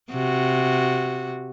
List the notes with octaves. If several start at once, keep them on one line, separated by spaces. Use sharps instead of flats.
C3 F#4